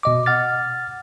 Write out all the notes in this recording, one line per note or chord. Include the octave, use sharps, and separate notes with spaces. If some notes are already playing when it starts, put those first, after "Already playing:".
B2 D#5 D6
F#5 F6 A6